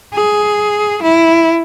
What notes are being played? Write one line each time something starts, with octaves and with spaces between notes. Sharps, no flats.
G#4
E4